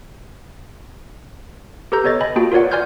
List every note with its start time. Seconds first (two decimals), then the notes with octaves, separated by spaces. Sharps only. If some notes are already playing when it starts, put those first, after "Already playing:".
1.92 G4 A4 B4 A#5 G6
2.04 B3 A4 C#5 D#5 A6
2.21 D#5 G#5 B5
2.36 A#3 F4 F#4 G#4 G5 A5
2.52 F4 A#4 B4 C#5 D5 F#5
2.71 D5 G#5 C6 F6 G6 G#6